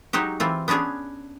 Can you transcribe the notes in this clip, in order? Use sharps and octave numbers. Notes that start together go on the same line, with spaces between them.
F#3 G#3 D#4 F#4 G4
E3 C4 F4
B3 C#4 D4 G#4 C#5